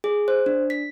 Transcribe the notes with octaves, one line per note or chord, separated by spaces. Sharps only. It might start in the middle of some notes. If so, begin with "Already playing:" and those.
G#4
C5
D4
B6